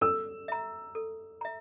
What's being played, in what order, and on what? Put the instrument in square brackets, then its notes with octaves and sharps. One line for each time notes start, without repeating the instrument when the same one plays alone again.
[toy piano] A4 [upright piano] E6
[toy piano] E5 A#5
A4
E5 A#5